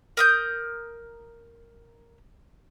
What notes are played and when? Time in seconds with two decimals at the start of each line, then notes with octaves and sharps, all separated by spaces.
0.17 A#4 D#6 G6